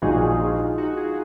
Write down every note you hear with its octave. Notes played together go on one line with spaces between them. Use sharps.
A#1 A#2 G#3 D#4 F4 F#4 G#4
F4 G#4
D#4 F#4
F4 G#4